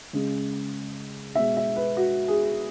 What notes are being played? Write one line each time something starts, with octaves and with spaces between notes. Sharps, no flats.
C#3 G#3
B2 G#3 E5
E5
B4
F#4
G#4